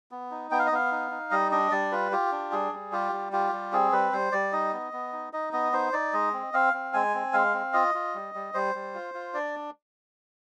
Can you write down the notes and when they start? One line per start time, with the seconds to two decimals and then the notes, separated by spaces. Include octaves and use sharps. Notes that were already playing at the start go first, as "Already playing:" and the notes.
0.11 B3
0.31 D#4
0.51 B3 G5
0.59 F5
0.66 D#5
0.72 B3 F5
0.91 D#4
1.11 D#4
1.31 G3 D#5
1.51 D4 D#5
1.71 G3 D5
1.92 F4 B4
2.12 F4 G4
2.32 D4
2.52 G3 G#4
2.72 G3
2.92 F4 G4
3.12 G3
3.32 F4 G4
3.52 G3
3.73 C4 G#4
3.92 G3 B4
4.13 G3 C5
4.32 G3 D5
4.52 D#4 D#5
4.73 B3
4.93 B3
5.13 D#4
5.33 D#4 D#5
5.53 B3 D#5
5.73 D#4 C5
5.93 D#4 D5
6.13 G#3 D#5
6.33 C4
6.54 C4 F5
6.73 C4
6.94 G#3 G#5
7.14 C4
7.33 G#3 F5
7.54 C4
7.73 F4 D#5
7.94 F4
8.14 G3
8.35 G3
8.54 G3 C5
8.75 G3
8.94 F4
9.14 F4
9.34 D4 D5